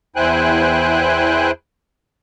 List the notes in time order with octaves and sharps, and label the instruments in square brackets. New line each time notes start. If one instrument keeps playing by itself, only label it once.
[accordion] E2 E4 C5 G5 G#5 F#6